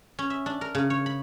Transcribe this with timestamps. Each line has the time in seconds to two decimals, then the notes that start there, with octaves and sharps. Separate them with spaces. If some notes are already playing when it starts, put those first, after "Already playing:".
0.19 C#4
0.30 E5
0.46 D4
0.61 A#4
0.75 C#3
0.90 C#5
1.06 B5